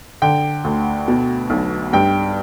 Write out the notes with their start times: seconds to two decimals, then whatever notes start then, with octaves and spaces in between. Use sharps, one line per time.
0.22 D3 G5
0.64 D2
1.08 B2
1.50 B1
1.93 G2 G5